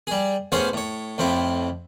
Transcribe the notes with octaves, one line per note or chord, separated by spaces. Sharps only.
G3 G#4
A1 B3 C#4 G#4 C5 F5
A2 C#5
F2 A2 C4 E4